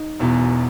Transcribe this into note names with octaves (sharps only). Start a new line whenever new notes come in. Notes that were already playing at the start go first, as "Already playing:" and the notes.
Already playing: D#4
E1 E2 B2